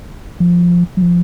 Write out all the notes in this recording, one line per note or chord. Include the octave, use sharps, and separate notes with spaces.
F3
F#3
F3